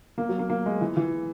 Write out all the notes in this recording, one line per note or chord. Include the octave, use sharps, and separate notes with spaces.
A#3
F#3
A#3
A#3
G#3
E3
E3